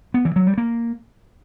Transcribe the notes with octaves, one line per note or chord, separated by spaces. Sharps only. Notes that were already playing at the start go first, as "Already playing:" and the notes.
B3
E3
F#3
G3
A#3